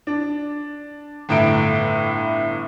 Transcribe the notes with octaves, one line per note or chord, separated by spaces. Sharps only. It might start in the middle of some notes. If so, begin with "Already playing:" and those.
D4
G1 A2 E4 D7